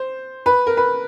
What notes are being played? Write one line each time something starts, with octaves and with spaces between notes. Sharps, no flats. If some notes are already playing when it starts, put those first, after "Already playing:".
Already playing: C5
B4
A#4
B4